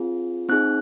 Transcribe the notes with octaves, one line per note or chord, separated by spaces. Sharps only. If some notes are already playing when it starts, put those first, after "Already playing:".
Already playing: C4 F4 G#4
C4 D#4 G#4 F#6